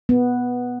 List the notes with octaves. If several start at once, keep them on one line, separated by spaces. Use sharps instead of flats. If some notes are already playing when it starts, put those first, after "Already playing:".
B3